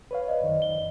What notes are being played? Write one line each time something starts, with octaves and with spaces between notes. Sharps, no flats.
B4 C#5 F5
C5 D5 D#5
F#2 D#3
G7